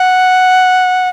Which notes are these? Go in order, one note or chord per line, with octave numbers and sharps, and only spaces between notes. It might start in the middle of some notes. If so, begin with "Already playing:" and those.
Already playing: F#5